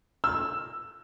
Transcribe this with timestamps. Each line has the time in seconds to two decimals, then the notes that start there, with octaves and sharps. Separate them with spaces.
0.24 E6